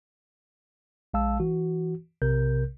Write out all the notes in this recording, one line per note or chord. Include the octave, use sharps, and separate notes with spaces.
A#1 G#3 F5 A5 E6
E3 F#4
B1 C3 A#4 G6